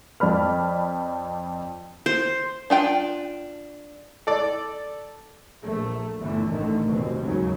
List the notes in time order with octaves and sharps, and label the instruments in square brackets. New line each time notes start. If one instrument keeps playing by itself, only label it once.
[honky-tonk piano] F2 D5 B5 F6
[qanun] C5
[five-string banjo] D4 F4 G5
[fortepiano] A4 D5
[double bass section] A#1 A3
G1 D3 E3 A3
A1 D3 D#3 A3
F1 F2 B2 C4
D#2 G#2 C#3 F#3